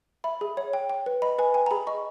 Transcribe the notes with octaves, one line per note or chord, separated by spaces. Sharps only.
E5 B5
G#4
C#5
G5
G5
B4
D#5 B5
B4 G#5
G5 G#5
A#5
G#4 B5
D#5 C#6